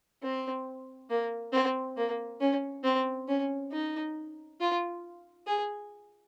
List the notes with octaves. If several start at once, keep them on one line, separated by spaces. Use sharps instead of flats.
C4
A#3
C4
A#3
C#4
C4
C#4
D#4
F4
G#4